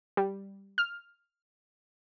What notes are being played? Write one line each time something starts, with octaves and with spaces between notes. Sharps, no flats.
G3
F6